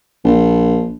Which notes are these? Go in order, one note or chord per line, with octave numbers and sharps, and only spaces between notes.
A#1